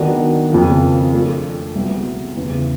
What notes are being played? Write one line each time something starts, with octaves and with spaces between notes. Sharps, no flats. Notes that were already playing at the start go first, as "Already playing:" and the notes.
Already playing: D#3 F#3 B3 D4 F#4
F2 C#3 F3 A#3
F3 A3 D4
C2 B2 G3 B3
E2 C#3 E3